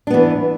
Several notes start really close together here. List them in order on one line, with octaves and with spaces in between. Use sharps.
D4 B3 E3